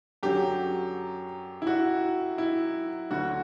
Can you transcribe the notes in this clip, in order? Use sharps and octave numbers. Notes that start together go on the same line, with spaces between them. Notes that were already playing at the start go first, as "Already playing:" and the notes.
F#2 D3 F#3 G4
E4
F#4
E4
D2 D3 F#3 F#4